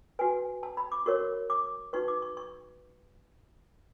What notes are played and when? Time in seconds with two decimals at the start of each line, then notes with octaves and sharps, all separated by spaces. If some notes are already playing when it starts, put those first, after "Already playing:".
0.19 F#4 B4 G#5
0.63 A5
0.77 B5
0.92 D6
1.06 F#4 A#4 C#5 C#6
1.50 D6
1.93 D#4 F#4 B4 C#6
2.08 D6
2.22 C#6
2.37 C#6